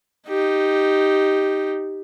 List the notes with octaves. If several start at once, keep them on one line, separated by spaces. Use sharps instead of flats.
D#4 G4